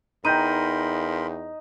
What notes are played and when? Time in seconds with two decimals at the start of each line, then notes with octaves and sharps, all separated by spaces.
0.25 E2 D#4 A#4 G5 B5 C6 G6 D#7